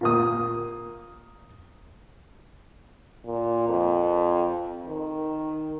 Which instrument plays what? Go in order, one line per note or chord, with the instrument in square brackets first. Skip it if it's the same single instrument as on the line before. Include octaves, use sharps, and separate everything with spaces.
[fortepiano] A#2 A#3 D#6
[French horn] A#2
F2
D#3